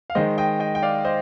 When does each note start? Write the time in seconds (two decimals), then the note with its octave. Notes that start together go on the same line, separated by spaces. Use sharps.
0.10 F5
0.15 D#3 G#3 C5 D#5
0.38 D#5 G5
0.60 D#5 G5
0.75 G5
0.82 D5 F5
1.05 C5 D#5